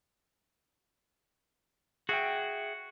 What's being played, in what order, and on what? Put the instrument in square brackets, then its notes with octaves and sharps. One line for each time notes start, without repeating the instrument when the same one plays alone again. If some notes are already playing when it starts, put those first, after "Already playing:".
[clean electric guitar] F#4 [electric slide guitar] G#4 E5 G5